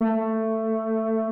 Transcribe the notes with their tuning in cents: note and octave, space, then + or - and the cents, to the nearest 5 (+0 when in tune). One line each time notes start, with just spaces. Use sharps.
A3 +15